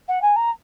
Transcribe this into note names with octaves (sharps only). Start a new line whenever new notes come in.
F#5
G#5
A#5